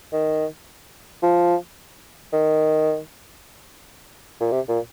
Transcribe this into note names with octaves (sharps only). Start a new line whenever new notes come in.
D#3
F3
D#3
A#2
C3
A#2